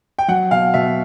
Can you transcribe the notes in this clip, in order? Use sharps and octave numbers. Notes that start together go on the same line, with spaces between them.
G5
F#3 F#5
B2 F5
B2 E5